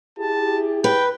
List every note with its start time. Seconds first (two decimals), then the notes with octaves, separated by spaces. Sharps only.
0.19 E4 G4 G#4 A5
0.84 B4 G5